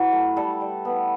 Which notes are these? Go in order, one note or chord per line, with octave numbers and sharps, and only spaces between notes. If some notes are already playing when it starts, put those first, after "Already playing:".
Already playing: F#3 E4 B4
A3
G3 A4
G3
B3